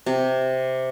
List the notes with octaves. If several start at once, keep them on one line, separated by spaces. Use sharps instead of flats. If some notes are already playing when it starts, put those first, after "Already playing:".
C3